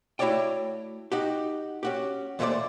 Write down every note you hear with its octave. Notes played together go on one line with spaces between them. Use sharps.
A3 E4 F#4 C#5 D5 G5
D#4 F#4 G4
C#4 F#4 G4
D#2 A#2 A3 F4 C5 D5